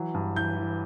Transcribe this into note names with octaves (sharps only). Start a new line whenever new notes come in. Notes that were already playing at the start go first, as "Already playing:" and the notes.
Already playing: E3 F#3
G2
E3 G6
E3